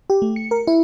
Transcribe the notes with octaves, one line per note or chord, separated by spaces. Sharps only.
G4
A3
C#7
A#4
E4